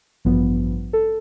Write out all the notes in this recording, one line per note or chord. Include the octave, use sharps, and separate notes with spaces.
A1 G2 F3 B3
A4